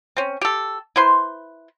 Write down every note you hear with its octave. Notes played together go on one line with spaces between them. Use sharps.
C4 C#4
G4 A4
E4 B4 C5 C6